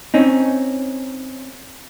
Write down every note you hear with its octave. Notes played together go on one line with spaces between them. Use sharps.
C4 C#4 D#4